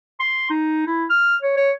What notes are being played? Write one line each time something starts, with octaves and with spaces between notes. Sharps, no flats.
C6
D#4
E4
F6
C#5
C#5